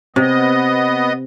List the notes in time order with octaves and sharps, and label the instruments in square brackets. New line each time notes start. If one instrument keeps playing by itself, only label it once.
[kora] C3 [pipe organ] B3 D#5